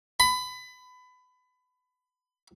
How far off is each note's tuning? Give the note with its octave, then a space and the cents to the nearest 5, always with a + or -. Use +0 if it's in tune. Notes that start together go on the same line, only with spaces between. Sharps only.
B5 +25